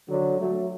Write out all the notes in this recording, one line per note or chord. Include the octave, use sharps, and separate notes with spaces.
D3 F#3
F#3 A3